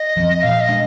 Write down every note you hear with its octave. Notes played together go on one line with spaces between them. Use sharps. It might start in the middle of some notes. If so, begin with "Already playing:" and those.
Already playing: D#5
F3 C4
A#2 F5
D#5
G#3 D4